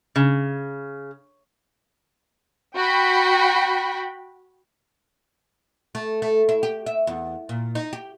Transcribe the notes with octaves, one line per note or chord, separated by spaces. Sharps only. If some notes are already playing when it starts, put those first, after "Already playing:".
C#3
F#4 G5 B5
A3
A3
E4
G4
E5
E2
A#2
D#4
G4